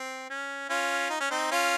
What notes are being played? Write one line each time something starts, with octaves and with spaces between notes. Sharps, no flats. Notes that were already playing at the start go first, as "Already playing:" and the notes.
Already playing: C4
C#4
C#4 F4
D#4
C#4
C4 D#4
C#4 F4